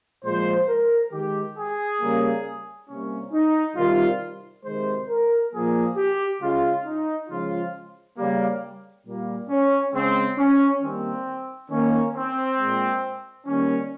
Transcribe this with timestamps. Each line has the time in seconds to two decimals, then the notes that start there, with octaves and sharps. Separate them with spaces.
0.24 A#2 F3 G#3 C5
0.69 A#4
1.12 D#3 G#3 G4
1.57 G#4
2.01 C#3 G3 A#3
2.89 C3 G3 A#3 C#4
3.33 D#4
3.77 C3 D#3 G3 F4
4.65 C3 D#3 G#3 C5
5.09 A#4
5.53 A#2 F3 A#3 G#4
5.98 G4
6.42 C#3 G#3 F4
6.86 D#4
7.29 C#3 F3 G#3 F4
8.18 C#3 G3 A#3
9.06 A#2 G3 A#3
9.50 C#4
9.94 C#3 G#3 C4
10.38 C#4
10.82 D#3 G3 A#3 C4
11.70 D#3 A#3 C#4
12.15 C4
12.58 A#2 G#3
13.47 D#3 G3 A#3 C#4